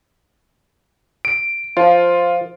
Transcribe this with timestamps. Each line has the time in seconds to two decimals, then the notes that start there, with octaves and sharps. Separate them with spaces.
1.25 D7
1.77 F3 F4